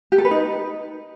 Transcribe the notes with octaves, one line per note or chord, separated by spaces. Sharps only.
G4
A4
B4
D#4